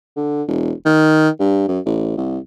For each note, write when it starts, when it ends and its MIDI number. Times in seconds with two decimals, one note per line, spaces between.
0.16 0.43 50
0.48 0.72 28
0.85 1.29 51
1.40 1.65 43
1.68 1.79 42
1.85 2.15 33
2.17 2.38 36